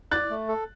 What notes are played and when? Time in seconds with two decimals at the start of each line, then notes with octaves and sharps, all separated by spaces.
0.11 D5 F#6 A6
0.30 A3
0.49 A4